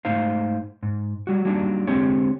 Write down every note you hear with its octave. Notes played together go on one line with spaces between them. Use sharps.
G#2 A3 D#4 C5 F5
G#2
F#3 G3 F#4
F#3 G3 A#3 D4 D#4
D3 G#3 C4 G4 C5 C#5